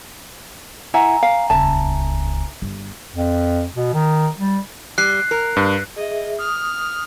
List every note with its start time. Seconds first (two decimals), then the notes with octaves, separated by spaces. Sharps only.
0.94 E4 E5 F#5 G#5 A#5
1.23 F5
1.50 D#1 C#2 E5 A5
2.62 G1
3.16 F2
3.76 B2
3.94 D#3
4.38 G3
4.98 G3 F#6 C7
5.31 A#4
5.57 G2
5.96 G#4 D#5 E5
6.39 D#6 F6